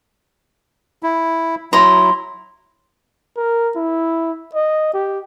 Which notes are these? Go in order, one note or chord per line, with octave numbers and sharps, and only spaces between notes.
E4
F#3 E4 A#5 C6
A#4
E4
D#5
G4